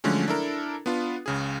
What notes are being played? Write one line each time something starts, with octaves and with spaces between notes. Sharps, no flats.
D3 F3 F#3 G#3 A3 C#4
D4 E4 A4 A#4
B3 D4 F4
C#2 C#3 G#4